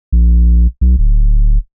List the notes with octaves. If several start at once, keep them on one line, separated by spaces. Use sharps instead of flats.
A#1
B1
D1